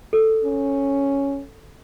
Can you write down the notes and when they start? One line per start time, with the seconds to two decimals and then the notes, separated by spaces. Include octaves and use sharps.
0.13 A4
0.45 C#4